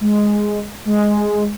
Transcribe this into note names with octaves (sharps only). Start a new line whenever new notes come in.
G#3
G#3